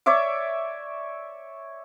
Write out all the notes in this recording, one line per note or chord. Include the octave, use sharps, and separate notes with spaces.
C#5 D5 E5 D6